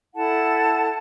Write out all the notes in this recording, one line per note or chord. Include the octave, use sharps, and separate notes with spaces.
E4 A4 F#5 A5